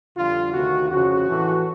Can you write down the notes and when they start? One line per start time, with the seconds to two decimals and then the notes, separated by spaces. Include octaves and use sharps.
0.16 F2 D3 G3 F4
0.54 D2 C3 D#3 F#4
0.90 F2 C#3 F3 F#4
1.27 A2 E3 A3